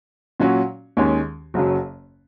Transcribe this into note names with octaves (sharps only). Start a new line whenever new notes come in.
A#2 F#3 C#4 F#4
D#2 D#3 G#3 C#4
F#1 F#2 C#3 F#3